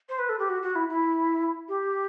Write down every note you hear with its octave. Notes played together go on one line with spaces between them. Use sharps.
C5
B4
A4
G4
F#4
F#4
E4
E4
G4